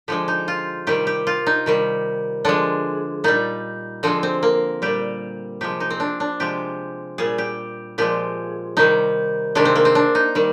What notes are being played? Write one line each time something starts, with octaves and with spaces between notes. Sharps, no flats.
D3 F3 G#3 G4
D#4
F4
C3 D#3 G3 G4
G4
F4
D#4
C3 D#3 G3
D3 F3 G#3 D4
A#2 G3 D#4
D3 F3 G#3 C4
C4
A#3
A#2 G3 G4
C3 F3 G#3 G4
D#4
C4
D4
D4
C3 F3 G#3 G4
A#2 G3 G#4
G4
A#2 F3 G#3 G4
C3 D#3 G3 D#4
C3 D#3 G#3 D4
C4
A#3
C4
D4
D#4
D#3 G3